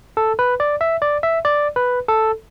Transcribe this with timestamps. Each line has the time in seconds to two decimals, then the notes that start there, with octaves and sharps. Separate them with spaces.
0.17 A4
0.39 B4
0.60 D5
0.81 E5
1.02 D5
1.23 E5
1.45 D5
1.76 B4
2.08 A4